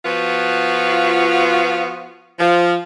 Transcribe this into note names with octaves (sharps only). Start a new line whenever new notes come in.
F3 B3 F4 F#4
F3